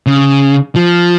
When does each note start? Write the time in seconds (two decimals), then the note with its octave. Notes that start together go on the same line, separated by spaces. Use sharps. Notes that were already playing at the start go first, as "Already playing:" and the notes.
0.07 C#3
0.76 F3